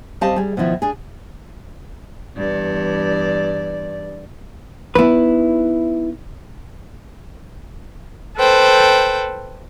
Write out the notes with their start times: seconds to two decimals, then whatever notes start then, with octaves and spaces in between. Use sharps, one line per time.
0.21 G3 C4 G4 D#5 F5 A5
0.36 G3 G#4
0.57 B2 D#3 F3 E4
0.82 D4 G#4
2.35 E2 G2 D5
4.95 B3 D#4 E4 B4
8.37 A4 B4 C5 G5